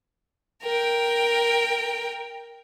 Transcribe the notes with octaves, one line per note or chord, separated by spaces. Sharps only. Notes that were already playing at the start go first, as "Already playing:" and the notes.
A#4 G5